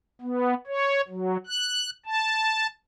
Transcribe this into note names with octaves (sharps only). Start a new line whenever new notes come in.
B3
C#5
F#3
F#6
A5